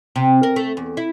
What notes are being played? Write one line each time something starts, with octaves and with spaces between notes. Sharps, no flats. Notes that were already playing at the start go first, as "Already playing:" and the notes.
C3
A#4
A3
E2
E4